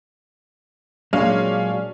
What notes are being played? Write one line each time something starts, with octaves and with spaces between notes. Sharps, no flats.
A#2 F#3 G#3 C#4 D4 F5